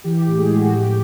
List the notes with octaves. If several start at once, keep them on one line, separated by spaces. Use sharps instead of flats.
E3 G4
G4
A2
G#3 G#4
A2
F#4
F2 G4